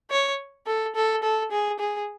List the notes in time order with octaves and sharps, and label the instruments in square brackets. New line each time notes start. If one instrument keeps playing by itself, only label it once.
[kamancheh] C#5
A4
A4
A4
G#4
G#4